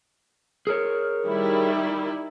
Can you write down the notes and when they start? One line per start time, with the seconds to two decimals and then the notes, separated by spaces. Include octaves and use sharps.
0.67 G#4 A#4 C#5
1.25 D#3 G3 E4